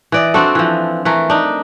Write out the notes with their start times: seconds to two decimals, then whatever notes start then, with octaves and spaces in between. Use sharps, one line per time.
0.12 E3 D5 D#5
0.34 C4 D4 F#4 A4
0.55 E3 F3
1.05 E3 A3 A#4
1.30 D4 D#4